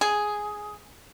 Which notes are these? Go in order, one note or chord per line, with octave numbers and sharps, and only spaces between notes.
G#4